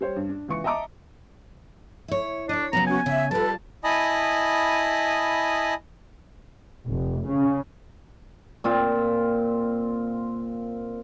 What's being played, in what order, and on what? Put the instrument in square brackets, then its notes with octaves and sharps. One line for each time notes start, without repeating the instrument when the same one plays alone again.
[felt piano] G3 C5 C#5
G2
D4
C#2 E3 C#6 C#7
D#5 E5 A5 A#5 D6
[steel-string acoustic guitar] E4 C#5
[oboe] D4 [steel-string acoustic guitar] C#5 D#5
[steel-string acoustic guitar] C#3 F#3 B3 [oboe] A#5
[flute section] C#4 F#4 [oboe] G#5
[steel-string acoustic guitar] C#3 [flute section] E5
[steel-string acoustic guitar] G3 F4 [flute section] A4 B4 [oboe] A5
[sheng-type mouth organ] E4 D#5 G#5 A5 B5 D#6
[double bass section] F1
C#3
[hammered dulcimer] A#2 C4 F4